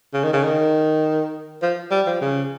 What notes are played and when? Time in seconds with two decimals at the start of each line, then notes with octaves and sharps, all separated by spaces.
0.14 C#3
0.23 D#3
0.33 C#3
0.44 D#3
1.62 F3
1.91 G3
2.07 F3
2.21 C#3